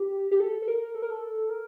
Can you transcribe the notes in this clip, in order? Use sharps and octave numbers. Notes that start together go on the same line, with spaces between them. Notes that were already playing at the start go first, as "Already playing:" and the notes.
Already playing: G4
G4
A4
A4
A#4
A4
A#4
A4
A#4